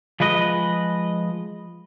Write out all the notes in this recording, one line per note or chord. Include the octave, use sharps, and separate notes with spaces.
F3 G#3 B4 D#5